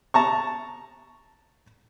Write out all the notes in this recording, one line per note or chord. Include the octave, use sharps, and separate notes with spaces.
A5 A#5 C#6